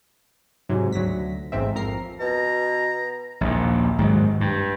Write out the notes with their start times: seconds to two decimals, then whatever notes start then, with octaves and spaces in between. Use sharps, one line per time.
0.69 G#2 C3 F#3
0.92 D2 F#3 A#6 B6
1.52 A1 G#2 C4 E5
1.75 F2 A#4 A#5 C7
2.20 B2 A#5
3.41 A#1 D#2
3.98 G#2 D#3 F#3
4.41 G2